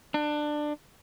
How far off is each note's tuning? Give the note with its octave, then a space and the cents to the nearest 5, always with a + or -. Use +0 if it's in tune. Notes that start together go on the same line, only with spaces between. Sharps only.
D4 +20